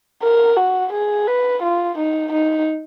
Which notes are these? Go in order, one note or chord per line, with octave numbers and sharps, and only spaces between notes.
A#4
F#4
G#4
B4
F4
D#4
D#4